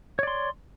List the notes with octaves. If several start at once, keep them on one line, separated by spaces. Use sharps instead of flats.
C#5 D5 C6